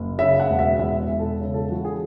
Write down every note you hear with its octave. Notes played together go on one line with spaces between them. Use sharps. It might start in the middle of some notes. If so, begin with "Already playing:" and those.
Already playing: F#1
C#3 E5
F#5
E1
E5
E2 E5
E5
E1
A4
C#3
A4
E3 F#4
G#4